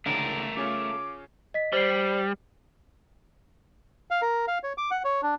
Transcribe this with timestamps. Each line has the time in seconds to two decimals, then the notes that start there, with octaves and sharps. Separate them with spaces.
0.06 C#2 D3 D#3 A3 A#4
0.57 C#3 C#4 F4 D6
1.54 D#5 B6
1.73 G3 C5 D5 C7
4.11 F5
4.22 A#4
4.48 F5
4.63 C#5
4.78 D6
4.91 F#5
5.05 C#5
5.22 D4